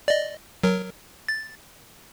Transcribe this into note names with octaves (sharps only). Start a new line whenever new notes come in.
D5 D#5
F#3 A#4
A6